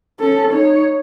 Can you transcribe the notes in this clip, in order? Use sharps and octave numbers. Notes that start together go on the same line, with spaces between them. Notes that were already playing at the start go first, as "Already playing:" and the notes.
C#4 A4
D#4 C#5